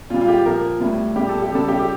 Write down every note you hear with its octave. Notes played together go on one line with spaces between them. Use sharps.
A#2 G3 F4
F4
G4
A#2 F3 A#4
A2 G3
A#2 G3 G4
A4
G4
C#3 G3 A4
G4
G4